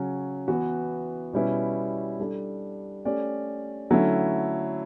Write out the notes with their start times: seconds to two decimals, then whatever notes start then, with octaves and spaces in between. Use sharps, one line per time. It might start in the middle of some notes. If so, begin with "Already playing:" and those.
Already playing: C#3 F#3 C#4
0.48 E3 B3 F#4
1.33 B2 G3 C#4 E4 B4
2.20 G3 D4 A4
3.05 A3 C#4 G4 D5
3.90 D3 F#3 A3 C#4 E4